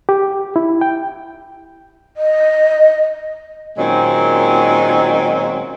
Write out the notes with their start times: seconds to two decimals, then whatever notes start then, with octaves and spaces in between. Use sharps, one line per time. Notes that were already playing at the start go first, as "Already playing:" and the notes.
0.09 G4
0.56 E4
0.81 G5
2.17 D#5
3.78 A#2 D#3 F#3 G#3 C4 C#4